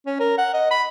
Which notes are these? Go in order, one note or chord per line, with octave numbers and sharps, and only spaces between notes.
C#4
A#4
F#5
D#5
B5